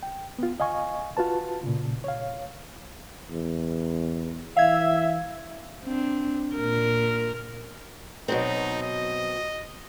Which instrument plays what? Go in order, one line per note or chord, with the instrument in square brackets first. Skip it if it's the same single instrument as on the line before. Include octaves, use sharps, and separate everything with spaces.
[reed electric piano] G5
B3 F4
D#5 F5 G#5 C#6
F4 F#4 B4 A5
A#2 C#3
C#5 F5
[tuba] E2
[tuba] E3 [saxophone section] E5 [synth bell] F5 G#6
[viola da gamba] C4 D4
A#2 A#4
[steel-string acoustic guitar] B2 F#3 C4 [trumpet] D#4
[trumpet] D#5